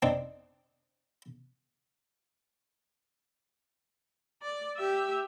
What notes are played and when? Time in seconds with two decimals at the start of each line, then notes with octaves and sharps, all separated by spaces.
0.02 C4 D4 D#4
4.42 D5
4.77 G4 E5